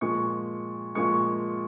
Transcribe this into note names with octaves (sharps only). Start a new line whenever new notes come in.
A#2 F3 G#3 C#6
A#2 F3 G#3 C#6